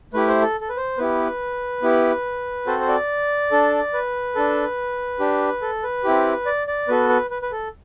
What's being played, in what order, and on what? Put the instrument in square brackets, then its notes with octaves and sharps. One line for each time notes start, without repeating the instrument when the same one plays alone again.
[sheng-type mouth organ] A3 E4 G4 B4
C5
A4
A4
B4
C5
B3 E4 G4 B4
B3 E4 G4
C4 F#4 A4 C5
C5
D5
D4 A4
B4
D4 A4
D4 G4
A4
B4
C4 E4 G4
D5
D5
B3 F#4 A4 B4
B4
B4
B4
A4